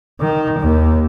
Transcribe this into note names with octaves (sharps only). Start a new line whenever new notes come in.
D#3
D#2